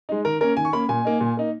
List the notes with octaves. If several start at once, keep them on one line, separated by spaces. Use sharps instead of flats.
G#3 D#4
D#3 A#4
A#3 C#4 A#4
D#3 G#5
C#6
A#3 C#4 B5
A#2 G#5
A#3 D#4
A#2
A#3 D#4